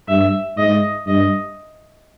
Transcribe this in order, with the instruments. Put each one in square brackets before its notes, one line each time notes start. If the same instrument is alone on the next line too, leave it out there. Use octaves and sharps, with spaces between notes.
[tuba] G2 [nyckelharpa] E5
[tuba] G#2 [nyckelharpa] D#5
[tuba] G2 [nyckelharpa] D#5